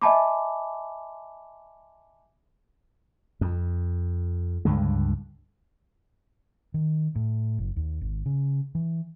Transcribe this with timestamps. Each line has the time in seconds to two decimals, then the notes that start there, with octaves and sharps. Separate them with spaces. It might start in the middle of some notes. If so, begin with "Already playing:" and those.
0.02 D#5 E5 G#5 A5 B5 D6
3.41 F2
4.65 C#2 G2 D3 G#3
6.74 D#3
7.15 A2
7.58 F#1
7.76 D#2
8.01 G#1
8.26 C#3
8.75 E3